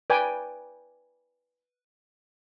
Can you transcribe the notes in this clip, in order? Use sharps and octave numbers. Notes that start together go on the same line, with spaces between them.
B4 D5 G5 G#5 D6